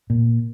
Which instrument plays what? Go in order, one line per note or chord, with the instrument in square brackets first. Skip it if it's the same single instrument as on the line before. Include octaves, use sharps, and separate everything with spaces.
[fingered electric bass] A#2